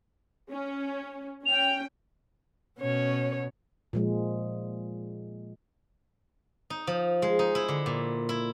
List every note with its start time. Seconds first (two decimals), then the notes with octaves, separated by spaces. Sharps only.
0.50 C#4
1.45 C#4 G5 F7
2.80 B2 C#4 C#5
3.93 A#2 F3 G#3
6.70 D#4
6.87 F3
7.22 G#3
7.39 D#4
7.55 E4
7.68 D3
7.86 A#2
8.29 E4